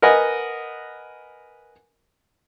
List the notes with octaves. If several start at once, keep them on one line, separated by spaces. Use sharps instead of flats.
A#4 B4 D#5 F#5 G#5